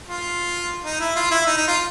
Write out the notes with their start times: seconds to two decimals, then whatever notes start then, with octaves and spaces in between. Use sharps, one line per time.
0.08 F4
0.85 D#4
1.01 E4
1.16 F4
1.31 E4
1.47 D#4
1.57 D#4
1.68 F4